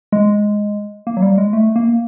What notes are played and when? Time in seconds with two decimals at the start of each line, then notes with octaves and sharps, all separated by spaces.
0.12 G#3
1.07 A#3
1.17 F#3
1.22 G3
1.38 G#3
1.53 A3
1.76 A#3